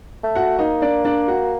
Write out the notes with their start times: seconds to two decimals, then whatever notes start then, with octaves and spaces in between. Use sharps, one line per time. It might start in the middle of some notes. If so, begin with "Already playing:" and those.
0.24 A3
0.35 F#4 F#5
0.59 A#3 D#4 D#5
0.82 D4 D5
1.05 D4 D5
1.28 F#4 F#5